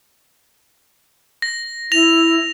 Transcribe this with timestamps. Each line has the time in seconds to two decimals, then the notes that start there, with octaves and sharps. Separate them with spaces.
1.42 A#6
1.92 E4 A#6 F7